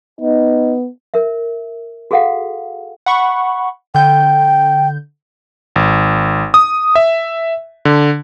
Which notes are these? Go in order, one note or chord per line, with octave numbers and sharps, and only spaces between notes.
B3 D#4
A#4 E5
F#4 G#4 A4 F5 F#5
F#5 B5 C#6
D3 G5 G6
G#1
D#6
E5
D3